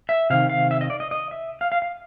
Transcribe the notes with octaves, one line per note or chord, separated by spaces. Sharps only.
E5
C3 D#3 F5
F5
E5
D#5
D5
D#5
D#5
E5
F5
F5
F5